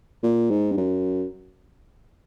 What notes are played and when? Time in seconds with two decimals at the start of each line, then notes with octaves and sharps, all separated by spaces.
0.23 A#2
0.50 G#2
0.72 G2
0.77 F#2